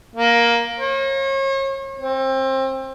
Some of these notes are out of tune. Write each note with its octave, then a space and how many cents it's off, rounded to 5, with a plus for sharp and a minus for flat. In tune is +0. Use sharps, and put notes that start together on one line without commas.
A#3 +10
C#5 -40
C4 +25